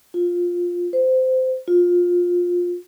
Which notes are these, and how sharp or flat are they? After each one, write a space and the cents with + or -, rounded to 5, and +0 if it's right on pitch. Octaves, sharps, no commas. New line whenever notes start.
F4 +10
C5 -20
F4 +15